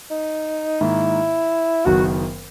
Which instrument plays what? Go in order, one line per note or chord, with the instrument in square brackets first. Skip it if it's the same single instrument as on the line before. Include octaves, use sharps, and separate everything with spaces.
[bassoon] D#4
[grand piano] G#2 D#3 A#3 [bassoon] E4
[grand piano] F#1 F#2 D#3 F#3 B3 [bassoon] F#4